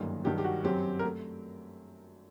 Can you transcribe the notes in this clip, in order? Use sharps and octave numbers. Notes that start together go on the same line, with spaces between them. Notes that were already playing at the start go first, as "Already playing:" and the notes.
Already playing: G1 F#2 D#3 G3 A#3
G2 D#3 F#3 G4
G4
F#4
F#2 F#3 C4 G4
A#4
A3